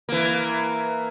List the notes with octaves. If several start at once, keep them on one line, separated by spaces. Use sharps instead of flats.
E3 A#3